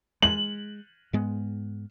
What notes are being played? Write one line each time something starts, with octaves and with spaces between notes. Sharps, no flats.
G#3 F#7
G#2 G#3 B3